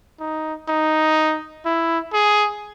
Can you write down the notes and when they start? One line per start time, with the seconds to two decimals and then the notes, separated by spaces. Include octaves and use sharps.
0.20 D#4
0.68 D#4
1.65 E4
2.13 G#4